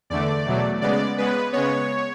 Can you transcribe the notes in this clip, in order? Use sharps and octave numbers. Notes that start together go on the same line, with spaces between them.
E2 D3 A3 D5
E2 B2 F#3 A3
C#3 G#3 B3 D5
C#3 G#3 B3 B4
C#3 G#3 B3 C#5